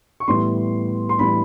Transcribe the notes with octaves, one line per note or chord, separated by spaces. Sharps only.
C#6
A2 E3 G3 B3 C6
C6
A2 E3 G3 B3 B5